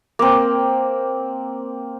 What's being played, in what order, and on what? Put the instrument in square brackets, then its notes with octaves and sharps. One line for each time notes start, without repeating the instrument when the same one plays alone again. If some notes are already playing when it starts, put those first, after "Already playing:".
[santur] A#3 C4